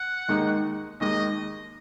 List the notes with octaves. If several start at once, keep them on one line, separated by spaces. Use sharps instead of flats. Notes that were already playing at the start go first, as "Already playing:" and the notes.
Already playing: F#5
D#2 D#3 G#3 D#4
D#2 D#3 G#3 D#4 D#5